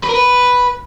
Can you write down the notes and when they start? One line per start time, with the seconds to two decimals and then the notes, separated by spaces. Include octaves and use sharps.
0.03 B4
0.09 A#4
0.14 B4